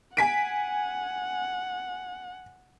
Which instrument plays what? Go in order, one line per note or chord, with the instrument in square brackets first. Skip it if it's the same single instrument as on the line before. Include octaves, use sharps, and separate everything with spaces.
[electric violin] F#5 [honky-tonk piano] G#5 B6 D7